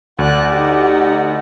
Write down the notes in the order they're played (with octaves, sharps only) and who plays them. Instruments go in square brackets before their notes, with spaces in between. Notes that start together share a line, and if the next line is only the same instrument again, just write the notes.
[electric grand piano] D2 [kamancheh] F#4 F#6 [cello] D5
[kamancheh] D#4 F#5 [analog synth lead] G4